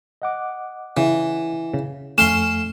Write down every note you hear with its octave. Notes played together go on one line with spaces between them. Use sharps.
D#5 F#5 D6
C#3 E3
C#3
F2 A3 C#4 F5 C6 E7